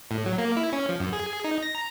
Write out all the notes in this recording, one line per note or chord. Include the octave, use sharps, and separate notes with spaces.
A2
F#3
A#3
E4
C#4
F3
F#2
G#4
D#4
A#6
A#5